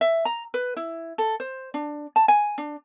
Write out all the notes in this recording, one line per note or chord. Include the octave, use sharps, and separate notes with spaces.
E5
A#5
B4
E4
A4
C5
D4
A5
G#5
D4